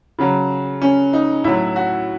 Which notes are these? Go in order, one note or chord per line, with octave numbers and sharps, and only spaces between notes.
C#3 F#3
C#4
D#4
A2 F#3 E4
F#4